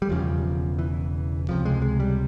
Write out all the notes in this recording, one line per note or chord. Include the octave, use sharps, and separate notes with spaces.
G3
E1 E2 C#3 F3
E3
C#2 C3 F3
G#3
G#3
G3